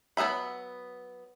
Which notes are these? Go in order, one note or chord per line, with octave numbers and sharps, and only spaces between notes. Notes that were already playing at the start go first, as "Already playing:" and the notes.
F#3 B3 G#4 E5 B5